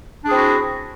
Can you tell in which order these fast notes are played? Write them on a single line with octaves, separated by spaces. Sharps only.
D4 G#4 C4 E4 F#4